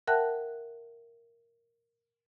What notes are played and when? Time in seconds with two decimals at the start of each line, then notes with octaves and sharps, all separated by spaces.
0.07 A#4 E5 F#5 G5 A5 F#6